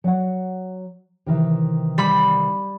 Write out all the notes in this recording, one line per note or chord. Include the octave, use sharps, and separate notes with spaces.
F#3 F#5
C3 D#3 E3
G3 B5